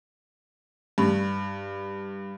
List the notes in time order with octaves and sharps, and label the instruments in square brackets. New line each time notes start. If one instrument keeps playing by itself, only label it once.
[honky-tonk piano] G2